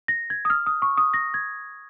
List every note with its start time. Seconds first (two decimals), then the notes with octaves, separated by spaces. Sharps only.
0.08 A#6
0.30 G#6
0.45 D#6
0.50 F6
0.66 D#6
0.82 C#6
0.97 D#6
1.14 A#6
1.34 G#6